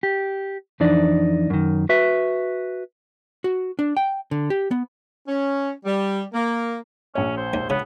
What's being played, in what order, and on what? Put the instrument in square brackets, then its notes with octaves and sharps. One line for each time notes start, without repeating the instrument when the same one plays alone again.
[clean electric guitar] G4
F2 E3 D4 D#4 D5
F#2 D#3
F#4 B4 E5
[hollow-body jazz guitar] F#4
D4
G5
D3
G4
B3
[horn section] C#4
G3
A#3
[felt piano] A#1 C#5 [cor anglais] C#4
[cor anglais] C5
[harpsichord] D#2
[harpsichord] C#3 [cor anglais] B3